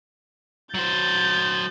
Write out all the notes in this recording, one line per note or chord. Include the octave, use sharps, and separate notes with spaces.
F#3 C5 G6 A6